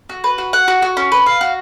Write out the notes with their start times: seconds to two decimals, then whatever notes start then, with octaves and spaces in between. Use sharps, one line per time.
0.09 F#4
0.24 B4
0.38 F#4
0.53 F#5
0.68 F#4
0.82 F#4
0.97 C#4
1.12 B4
1.26 F5
1.41 F#4